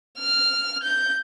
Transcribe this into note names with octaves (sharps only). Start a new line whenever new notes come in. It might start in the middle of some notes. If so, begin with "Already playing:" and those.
F6
G6